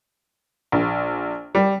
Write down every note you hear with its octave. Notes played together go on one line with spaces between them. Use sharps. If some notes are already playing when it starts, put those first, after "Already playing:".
A#1
G3